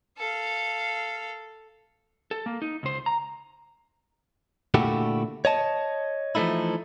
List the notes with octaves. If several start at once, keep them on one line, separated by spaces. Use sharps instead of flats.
A4 F5
A4
A#3
D#4
C#2 C5
A#5
A#2 D3 A3 E4 F#4 G4
C#5 D#5 A5
E3 F3 G#3 A3 D#4 E4